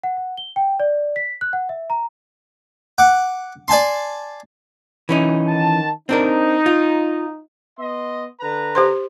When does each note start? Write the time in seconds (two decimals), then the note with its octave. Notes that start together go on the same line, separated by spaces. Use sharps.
0.03 F#5
0.17 F#5
0.37 G7
0.56 G5
0.80 D5
1.16 B6
1.41 F#6
1.53 F#5
1.69 E5
1.90 A#5
2.98 F#5 D6
3.68 D5 G#5 A5 C6
5.09 E3 C#4 D#4
5.48 D#3 A5
6.09 C4 D4 D#4 A#4
6.66 F4
7.78 B3 D#5 C6
8.41 D3 B4 A#5
8.75 G4 C5 C6